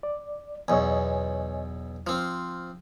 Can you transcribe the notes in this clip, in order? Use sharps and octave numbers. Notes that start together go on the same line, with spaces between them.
D5
B1 E2 C#5 D#5 G#5
F3 C4 F6